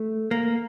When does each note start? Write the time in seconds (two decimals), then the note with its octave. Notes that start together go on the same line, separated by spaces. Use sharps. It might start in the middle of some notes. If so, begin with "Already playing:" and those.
Already playing: A3
0.31 A#3